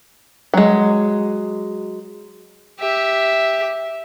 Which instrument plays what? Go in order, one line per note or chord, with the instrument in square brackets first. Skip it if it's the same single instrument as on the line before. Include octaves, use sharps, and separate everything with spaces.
[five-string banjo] F#3 G#3
[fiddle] G4 E5